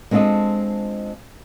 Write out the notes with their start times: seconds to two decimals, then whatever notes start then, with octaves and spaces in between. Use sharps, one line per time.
0.11 G#3 C4 D4 F4 A4 D#5